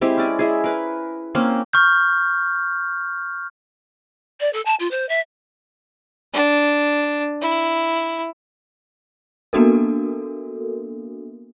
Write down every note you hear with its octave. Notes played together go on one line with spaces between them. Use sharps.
G#3 C4 E4 G4
C#4 D5 G#5
G#3 E4 G#4
A#4 B4
A#3 C4 C#4
C#6 F6 G6
D5
A4
A5
F4
C5
E5
D4
E4
A#3 B3 D4 F#4 A4 A#4